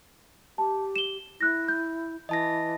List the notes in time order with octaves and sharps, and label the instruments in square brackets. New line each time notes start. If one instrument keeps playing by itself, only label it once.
[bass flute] G4 [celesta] A5
[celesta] E7 G7
[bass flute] E4 [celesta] F#6 A#6
[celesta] G6
[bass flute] E3 [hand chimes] D#5 A5 A#6